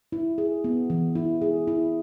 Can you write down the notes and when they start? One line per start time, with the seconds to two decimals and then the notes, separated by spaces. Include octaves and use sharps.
0.12 E4
0.38 G#4
0.64 B3
0.90 E3
1.16 E4
1.42 G#4
1.67 E4